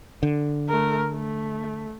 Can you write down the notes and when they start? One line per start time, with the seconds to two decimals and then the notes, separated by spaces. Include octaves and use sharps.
0.23 D3
0.69 A3 A#4
1.13 A3